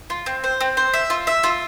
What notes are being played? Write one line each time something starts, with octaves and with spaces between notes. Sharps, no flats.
F4
C4
C5
C4
C5
E5
F4
E5
F4